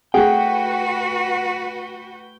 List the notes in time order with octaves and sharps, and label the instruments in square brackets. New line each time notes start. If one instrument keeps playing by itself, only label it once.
[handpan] A3 F#5 [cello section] F#4 B4 [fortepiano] G#4 [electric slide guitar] G5